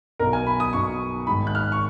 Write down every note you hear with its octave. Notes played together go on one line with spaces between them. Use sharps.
B1 B2 A#4
G#5
B5
D#6
B1 B2 C#6
G#1 G#2 D#3 B5
F#6
F6
C#6